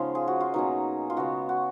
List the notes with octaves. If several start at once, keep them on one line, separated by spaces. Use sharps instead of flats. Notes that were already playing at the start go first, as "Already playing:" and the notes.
Already playing: C#3 F3 G#3 B3 C#4 D#4 F4
G#4
F#4
F4
B2 F#3 A#3 C#4 D#4
F4
C#3 G#3 B3 F#4
F#4